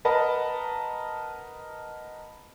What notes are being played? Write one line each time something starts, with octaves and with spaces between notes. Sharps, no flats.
A#4 B4 D#5 F#5 A5 B5